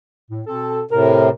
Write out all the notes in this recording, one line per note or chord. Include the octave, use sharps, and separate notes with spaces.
A2
B2 C4 A4
A2 C3 A#4